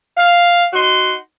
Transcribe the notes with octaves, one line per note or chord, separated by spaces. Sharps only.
F5
D#4 F#4 C6